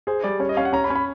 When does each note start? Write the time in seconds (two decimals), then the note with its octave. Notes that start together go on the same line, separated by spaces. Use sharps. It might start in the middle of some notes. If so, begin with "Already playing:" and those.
0.07 G#4 C5
0.24 G3 D5
0.40 C#4 C#5
0.49 D#5
0.57 C#4 F5
0.65 F#5
0.73 C#4 A#5
0.84 B5
0.90 C#4
0.95 B5